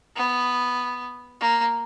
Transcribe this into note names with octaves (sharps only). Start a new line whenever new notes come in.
B3
A#3